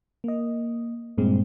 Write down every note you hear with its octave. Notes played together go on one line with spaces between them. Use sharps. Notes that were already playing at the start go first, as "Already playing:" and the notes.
A#3 D#5
G2 A#2 G#3 C4